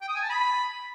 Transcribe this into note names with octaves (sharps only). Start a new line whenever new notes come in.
G5
D#6
G#5
A5
B5